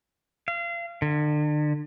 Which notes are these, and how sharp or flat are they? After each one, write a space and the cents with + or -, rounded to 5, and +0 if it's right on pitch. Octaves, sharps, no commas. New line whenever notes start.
F5 -30
D3 +35